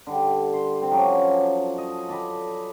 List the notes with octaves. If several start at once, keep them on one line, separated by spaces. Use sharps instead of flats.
D3 G3
C6
C4 G5
F3 F#3 C#4 D4
D#5
A4 D5 D#5 B5